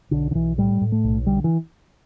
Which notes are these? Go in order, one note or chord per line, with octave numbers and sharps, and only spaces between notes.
B1 D3
D3
B1 E3
A2 G3
A2
A3
B1
D3 G3
E3